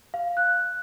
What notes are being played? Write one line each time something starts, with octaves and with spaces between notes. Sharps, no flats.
F5
F#6